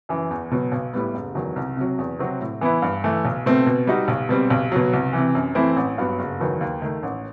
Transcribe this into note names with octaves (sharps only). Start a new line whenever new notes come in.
F#2 E3
E2
B2 F#3
B1
A2 G3 B3
F#1
E2 D#3 F#3
C2
C3 F#3
E2
C3 F#3 C4 F#4
A2
E3 B3 E4
G2
E3 A3
B1
B2 A3 C4
B2
G3 D#4 F#4
B1
B2 G3 C4
B1
B2 F#3
C2
C3 E3
F#2
E3 A3 C4 E4
A1
G2 F#3 B3
F#1
E2 D#3 F#3 B3
D#2
D#3 A3
A1